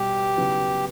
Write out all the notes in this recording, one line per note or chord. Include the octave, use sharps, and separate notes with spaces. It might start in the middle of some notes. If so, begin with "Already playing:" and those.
Already playing: B2 G3 G4
C#3 F#3 B3 E4